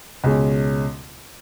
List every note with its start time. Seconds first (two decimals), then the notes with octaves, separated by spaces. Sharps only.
0.24 C#2 B2 G#3 C#4